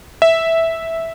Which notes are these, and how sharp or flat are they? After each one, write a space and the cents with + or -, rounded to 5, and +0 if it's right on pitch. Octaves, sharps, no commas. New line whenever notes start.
E5 -5